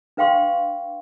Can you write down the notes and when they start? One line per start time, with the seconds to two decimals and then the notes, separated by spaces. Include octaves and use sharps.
0.17 D4 B4 F5 G5 C6 C#6